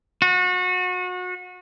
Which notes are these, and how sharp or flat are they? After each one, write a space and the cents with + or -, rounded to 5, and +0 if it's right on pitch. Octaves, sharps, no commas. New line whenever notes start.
F#4 -30